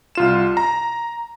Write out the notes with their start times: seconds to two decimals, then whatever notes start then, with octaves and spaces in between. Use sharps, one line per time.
0.15 C2 F4 E7
0.57 A#5